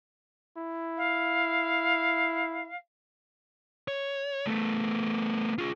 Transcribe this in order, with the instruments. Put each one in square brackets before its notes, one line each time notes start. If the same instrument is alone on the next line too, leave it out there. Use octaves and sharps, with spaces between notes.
[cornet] E4
[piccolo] F5
[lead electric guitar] C#5
A3 B3
F4 G#4